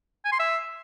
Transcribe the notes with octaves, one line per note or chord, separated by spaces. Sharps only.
G#5
C6
E5